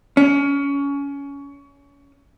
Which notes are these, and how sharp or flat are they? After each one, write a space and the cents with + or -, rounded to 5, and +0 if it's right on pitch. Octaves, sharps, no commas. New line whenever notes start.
C#4 +25